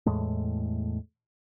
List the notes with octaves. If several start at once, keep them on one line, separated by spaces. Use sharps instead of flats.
E2 A2 G#3 A3